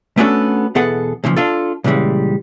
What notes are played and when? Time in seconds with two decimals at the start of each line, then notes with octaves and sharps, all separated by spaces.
0.17 A3 B3 C#4 D4 F#4 A4
0.75 E2 B2 B3 G#4 A4 F#5
1.24 B1 A#2 C#3 F3
1.36 D4 F4 A4
1.84 A#2 C#3 E3 G3 G#3